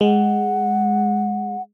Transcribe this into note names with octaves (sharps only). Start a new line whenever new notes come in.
G#3 F#5